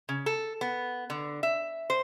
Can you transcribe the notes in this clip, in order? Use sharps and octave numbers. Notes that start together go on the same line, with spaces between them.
C#3
A4
B3
D3
E5
C5